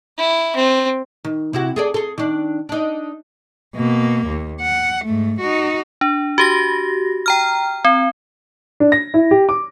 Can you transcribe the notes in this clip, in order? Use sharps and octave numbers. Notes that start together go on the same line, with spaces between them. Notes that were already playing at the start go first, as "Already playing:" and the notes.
E4
C4
D#3
C3 E4 F#4
G#4 A4 D5
G#4 A4
D#3 D4
D4 D#4
B2 A#3
D#2
F#5
G#2 A3
D#4 F#4
D4
F#4 G4 A#6
G5 A#5 F6
C4
D4
A#6
E4
G4
D6